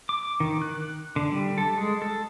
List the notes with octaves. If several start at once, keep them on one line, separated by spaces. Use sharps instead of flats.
D6
D#3
F#6
D3
G3
A4
G#3
A4